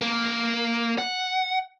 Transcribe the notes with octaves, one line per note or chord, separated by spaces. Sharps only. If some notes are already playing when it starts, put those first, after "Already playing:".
A#3
F#5